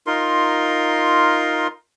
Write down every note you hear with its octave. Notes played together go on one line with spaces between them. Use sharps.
D#4 F4 A#4 C6